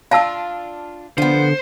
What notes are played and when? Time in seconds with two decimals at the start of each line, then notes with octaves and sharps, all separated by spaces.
0.11 D4 F4 F5 A5 E6
1.18 D3 F3 B3 C5